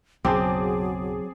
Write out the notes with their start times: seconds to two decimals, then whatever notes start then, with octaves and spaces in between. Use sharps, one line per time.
0.25 B1 F#2 C#3 F#3 C4 G#4 A5 D6